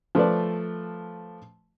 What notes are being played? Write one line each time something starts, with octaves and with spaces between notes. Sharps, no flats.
F3 A3 B4 D5